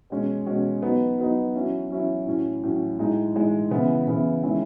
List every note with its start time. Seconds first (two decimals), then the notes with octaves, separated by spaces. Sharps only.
0.10 B2 G#3 C#4
0.46 B2 G#3 C#4
0.82 F#3 B3 D#4
1.18 F#3 B3 D#4
1.55 F#3 C#4 E4
1.90 F#3 C#4 E4
2.27 A2 F#3 C#4
2.63 A2 F#3 C#4
2.99 A2 G#3 D#4
3.35 A2 G#3 D#4
3.71 C#3 E3 B3 E4
4.07 C#3 E3 B3 E4
4.43 D#3 G#3 C#4 E4